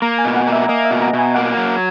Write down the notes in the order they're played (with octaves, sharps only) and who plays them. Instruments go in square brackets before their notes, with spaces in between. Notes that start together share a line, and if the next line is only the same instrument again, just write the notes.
[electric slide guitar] A#3 [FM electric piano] A#5
[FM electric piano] G#5
[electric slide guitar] B2
[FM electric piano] F#5
[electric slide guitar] A#3
[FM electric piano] E5
[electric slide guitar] A#3 [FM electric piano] D#5
[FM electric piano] E5
[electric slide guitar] B2
[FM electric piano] A#5
[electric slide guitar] B2
[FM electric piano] G#5
[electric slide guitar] A#3 [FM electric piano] F#5
[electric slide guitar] F#3